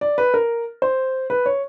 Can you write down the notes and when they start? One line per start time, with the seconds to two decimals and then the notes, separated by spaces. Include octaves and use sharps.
0.01 D5
0.18 B4
0.34 A#4
0.82 C5
1.30 B4
1.46 C#5